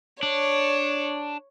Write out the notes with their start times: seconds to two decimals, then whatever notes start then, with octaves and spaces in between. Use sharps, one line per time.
0.23 D4 C#5